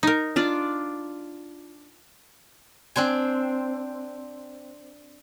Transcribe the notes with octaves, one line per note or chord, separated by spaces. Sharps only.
D#4 A#4
D4 F4 D5
C4 D4 C5 G#5